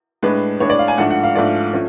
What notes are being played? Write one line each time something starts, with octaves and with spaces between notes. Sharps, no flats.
A2 G#3 D4 B4
A2 G#3 D4 C#5
D5
F5
G#5
G#2 F3 A3 D4 F#5
F#5
F5
G#2 F3 A3 D4 D5
F3 A3 C#4